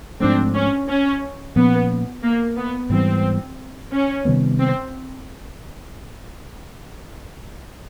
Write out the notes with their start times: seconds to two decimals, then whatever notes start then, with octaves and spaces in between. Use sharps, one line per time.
0.20 G#2 F3 A3 C4 D4
0.54 C#4
0.88 C#4
1.55 A#2 F3 A#3 B3 C#4
2.23 A#3
2.57 B3
2.90 G#2 E3 G3 B3 C4
3.92 C#4
4.25 C3 D#3 G3 B3
4.59 C4